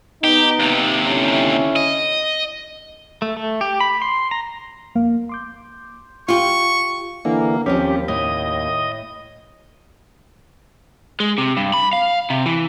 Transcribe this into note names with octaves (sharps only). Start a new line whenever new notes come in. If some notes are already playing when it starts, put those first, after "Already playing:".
B3 D#4 G4
D#2 C3
D3 C#4 E4
D#5
A3
A3
G4
B5
C6
A#5
F2 A#3 F5
C6 D6 G6
F4 G4 C#6
D3 E3 A#3
D#2 F3 C4 C#4 G4
A2 D#5
G#3
C3
G2
B5
F5
C3
E3